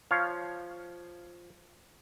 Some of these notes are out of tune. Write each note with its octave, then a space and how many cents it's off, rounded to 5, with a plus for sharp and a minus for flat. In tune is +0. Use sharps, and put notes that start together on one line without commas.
F3 +0 C#5 +10 F5 -5